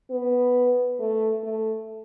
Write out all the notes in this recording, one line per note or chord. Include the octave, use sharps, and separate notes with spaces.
B3
A3
A3